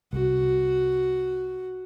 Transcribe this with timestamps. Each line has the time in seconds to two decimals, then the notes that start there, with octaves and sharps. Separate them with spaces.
0.13 C2 F#4